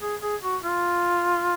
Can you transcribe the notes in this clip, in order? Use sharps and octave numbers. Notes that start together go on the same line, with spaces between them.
G#4
G#4
F#4
F4